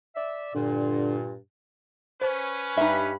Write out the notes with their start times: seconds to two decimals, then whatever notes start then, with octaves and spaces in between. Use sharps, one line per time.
0.16 D5 E5
0.55 G2 A#2 D3
2.21 C#4 B4 C5
2.77 G2 D#4 E5 B5